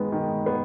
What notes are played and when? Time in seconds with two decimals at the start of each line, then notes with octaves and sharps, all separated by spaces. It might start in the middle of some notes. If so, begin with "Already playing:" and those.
Already playing: D#3 G#3 B3
0.12 D#3
0.46 B3